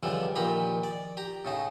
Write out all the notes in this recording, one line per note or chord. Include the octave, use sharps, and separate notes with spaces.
C#2 D3 E3 F3 G3
A#1 A#2 D#3 G4 A#5 B5
D5
G4 A#5
A2 C#3 D#4